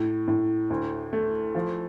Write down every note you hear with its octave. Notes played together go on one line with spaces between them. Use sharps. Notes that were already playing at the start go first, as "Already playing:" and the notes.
Already playing: A2
A2
D2
A3
F3